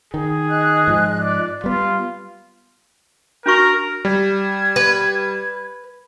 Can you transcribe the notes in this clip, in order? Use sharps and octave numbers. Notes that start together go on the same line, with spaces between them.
D#3 G#4
D#5 F#6
G#2 F3
D5
G3 B3 F4
D4 F#4 A#4 C#6
G3 G#6
B4